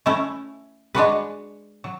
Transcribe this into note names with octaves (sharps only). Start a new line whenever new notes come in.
A3 C#4 E4
G#3 D4 F#4 B4
F#3